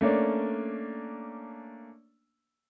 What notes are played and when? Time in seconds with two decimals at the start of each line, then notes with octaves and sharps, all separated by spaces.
0.01 A3 A#3 C#4 D4